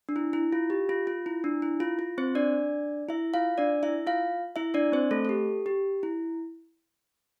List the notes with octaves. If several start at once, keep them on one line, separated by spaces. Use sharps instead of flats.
D4
E4
E4
F4
G4
F4
F4
E4
D4
E4
F4
F4
C4 C5
D4 D5
E4 E5
F4 F5
D4 D5
E4 E5
F4 F5
E4 E5
D4 D5
C4 C5
A3 A4
A4
G4
G4
E4